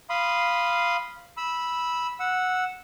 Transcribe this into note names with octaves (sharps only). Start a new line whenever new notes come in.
F5 B5 C6 D#6
B5 E6
F#5 E6